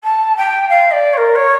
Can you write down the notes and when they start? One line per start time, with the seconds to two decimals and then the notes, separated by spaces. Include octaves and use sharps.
0.03 A5
0.37 G5
0.69 F5
0.91 D5
1.13 C#5
1.17 A#4
1.35 C#5